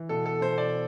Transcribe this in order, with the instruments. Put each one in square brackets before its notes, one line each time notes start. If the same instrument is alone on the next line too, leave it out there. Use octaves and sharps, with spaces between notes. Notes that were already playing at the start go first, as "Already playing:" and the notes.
Already playing: [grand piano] E3
B2 A4
A4
B2 C5
D5